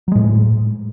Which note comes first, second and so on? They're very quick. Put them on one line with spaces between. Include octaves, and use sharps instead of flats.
F#3 G#3 A2